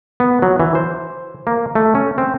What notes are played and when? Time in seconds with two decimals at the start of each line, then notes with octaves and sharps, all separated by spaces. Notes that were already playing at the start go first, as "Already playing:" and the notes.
0.20 B3
0.42 F#3
0.60 E3
0.75 C5
1.47 A#3
1.75 A3
1.95 C#4
2.18 C4